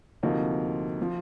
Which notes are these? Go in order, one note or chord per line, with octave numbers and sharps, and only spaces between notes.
D2 C3 F3 A#3 D#4
F3